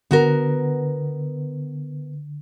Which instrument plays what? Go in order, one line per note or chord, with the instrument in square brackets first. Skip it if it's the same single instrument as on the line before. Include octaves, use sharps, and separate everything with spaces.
[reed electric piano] D3 [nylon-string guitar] B3 F#4 A#4